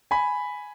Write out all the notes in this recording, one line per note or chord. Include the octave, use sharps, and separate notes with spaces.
G#5 B5